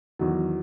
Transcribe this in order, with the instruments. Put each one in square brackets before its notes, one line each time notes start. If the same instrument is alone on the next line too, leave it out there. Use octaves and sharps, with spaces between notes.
[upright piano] E2 D#3 F#3